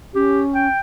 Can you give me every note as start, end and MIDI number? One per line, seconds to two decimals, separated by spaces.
0.15 0.68 61
0.15 0.42 67
0.55 0.80 79